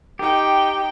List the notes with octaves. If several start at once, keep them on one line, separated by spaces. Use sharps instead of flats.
D#4 G4 G5